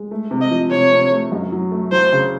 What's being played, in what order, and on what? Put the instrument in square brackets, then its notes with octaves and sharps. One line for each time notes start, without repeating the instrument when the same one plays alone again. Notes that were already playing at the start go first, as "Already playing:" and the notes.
Already playing: [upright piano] G#3
A3
C3
[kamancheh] D#5
[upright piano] F3
[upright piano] C3 [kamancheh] C#5
[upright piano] C3
A3
F#2
F#3
A3
[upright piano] F#3 [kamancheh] C5
[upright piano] C#3